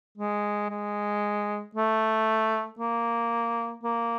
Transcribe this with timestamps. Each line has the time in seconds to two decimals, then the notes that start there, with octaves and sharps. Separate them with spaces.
0.18 G#3
0.70 G#3
1.75 A3
2.79 A#3
3.83 A#3